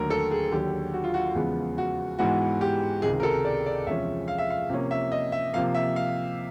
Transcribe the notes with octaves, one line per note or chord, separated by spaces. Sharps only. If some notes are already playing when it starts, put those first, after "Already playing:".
Already playing: D#2 D3 F#3 A3 A#4
A4
G#4
D#2 D3 F#3 G4
F#4
F4
F#4
E2 C#3 F3 G#3 B3
F#4
G#2 E3 G#3 B3 F#4
G4
C#2 C3 D#3 G#3 G#4
A#4
A4
D5
D5
E2 C3 F3 G#3 C#4 E5
F5
E5
F5
C3 F3 A#3 C#4
E5
D#5
E5
C3 F3 A#3 F5
E5
F5